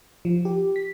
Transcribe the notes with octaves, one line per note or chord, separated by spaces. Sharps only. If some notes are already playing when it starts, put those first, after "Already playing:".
F3
G4
B6